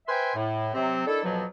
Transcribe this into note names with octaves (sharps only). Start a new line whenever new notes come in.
B4 C5 E5 G5 G#5 C6
A2
C3 F#3 C4
D#3 D4 E4 A4
F2 B2 F3 F#3